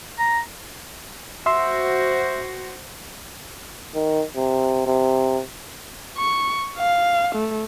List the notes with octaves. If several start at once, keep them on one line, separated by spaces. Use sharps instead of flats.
A#5
F#4 C5 E5 C6 E6
D#3
C3
C3
C#6
F5
A3